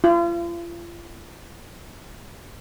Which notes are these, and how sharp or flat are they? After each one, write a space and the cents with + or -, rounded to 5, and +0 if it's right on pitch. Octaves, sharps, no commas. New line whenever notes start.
F4 -40